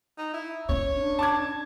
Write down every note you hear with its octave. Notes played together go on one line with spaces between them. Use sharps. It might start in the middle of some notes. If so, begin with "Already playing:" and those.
D#4
E4
C#4 C#5
D4
A5 D6 G#6